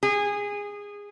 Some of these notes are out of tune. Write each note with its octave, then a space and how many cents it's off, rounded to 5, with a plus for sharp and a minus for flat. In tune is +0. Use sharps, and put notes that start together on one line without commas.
G#4 -20